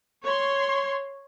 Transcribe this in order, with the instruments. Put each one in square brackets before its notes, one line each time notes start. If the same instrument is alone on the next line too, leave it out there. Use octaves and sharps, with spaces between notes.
[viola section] C#5 C6